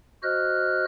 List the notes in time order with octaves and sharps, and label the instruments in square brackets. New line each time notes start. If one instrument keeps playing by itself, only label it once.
[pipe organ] F#4 C5 D#5 F6 F#6